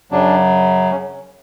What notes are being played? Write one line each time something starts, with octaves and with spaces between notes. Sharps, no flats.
F#2 C#3 F#3 D4
C#4